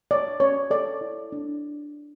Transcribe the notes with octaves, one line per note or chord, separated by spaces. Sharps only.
C#5 D5
C#4 C#5
A4 D5
E4
D4